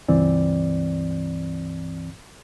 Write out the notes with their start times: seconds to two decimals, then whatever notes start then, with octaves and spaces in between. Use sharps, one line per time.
0.08 C#2 G2 E3 C4 D5